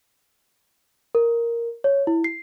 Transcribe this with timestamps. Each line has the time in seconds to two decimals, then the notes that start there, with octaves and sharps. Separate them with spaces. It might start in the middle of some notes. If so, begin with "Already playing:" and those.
1.15 A#4
1.84 C#5
2.07 E4
2.24 C7